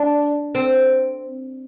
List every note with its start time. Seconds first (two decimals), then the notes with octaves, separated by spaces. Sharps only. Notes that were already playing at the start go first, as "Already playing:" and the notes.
Already playing: D4
0.55 C4